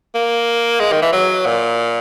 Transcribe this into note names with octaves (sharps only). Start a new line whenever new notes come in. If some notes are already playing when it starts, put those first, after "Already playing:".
A#3
G#3
D#3
E3
F#3
A#2